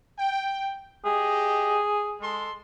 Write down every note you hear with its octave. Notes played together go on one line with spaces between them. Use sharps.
G5
G4 G#4 D#5
G#3 A4 C6